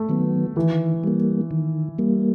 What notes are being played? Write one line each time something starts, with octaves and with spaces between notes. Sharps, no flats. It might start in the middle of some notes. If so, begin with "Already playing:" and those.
Already playing: A3
D#3 F#3 B3
D#3 E3
G3 A#3
D#3
G3 A#3